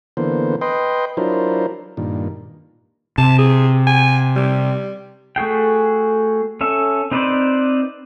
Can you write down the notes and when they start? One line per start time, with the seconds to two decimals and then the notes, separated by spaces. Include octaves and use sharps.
0.17 D3 E3 A#3 B3 C5
0.61 B4 D#5 G5 C6
1.17 F#3 D4 E4 F4 A#4 C5
1.97 G2 A#2 D#3
3.18 C3 A5
3.39 G#4
3.87 G#5
4.36 G3
5.36 A3 F#4 G#4 G5
6.61 C#4 A4 E5
7.11 C4 D#4 B4 C5 D5